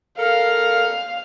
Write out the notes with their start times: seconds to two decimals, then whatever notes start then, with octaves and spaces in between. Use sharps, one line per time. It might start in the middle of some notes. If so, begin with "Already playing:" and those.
0.19 A4 A#4 F5